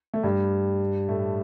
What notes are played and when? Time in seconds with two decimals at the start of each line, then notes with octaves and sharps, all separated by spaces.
0.14 A3
0.23 G2 G3
1.09 A2 A3